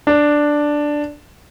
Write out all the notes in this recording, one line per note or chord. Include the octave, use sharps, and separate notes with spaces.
D4